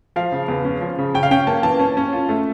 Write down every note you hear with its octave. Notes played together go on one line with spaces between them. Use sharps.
F3 F5
C#3
E2
C#4
F3
C#3
C#4 G5
F5
C#4 G5
A#3 A5
E3 A5
C#4
C#4
F4
A3